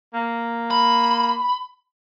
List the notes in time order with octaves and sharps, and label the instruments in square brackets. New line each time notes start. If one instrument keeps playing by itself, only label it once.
[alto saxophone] A#3
[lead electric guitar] B5